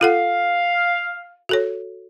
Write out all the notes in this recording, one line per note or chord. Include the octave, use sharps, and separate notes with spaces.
F4 A4 F5 F#5
F#4 A4 C#5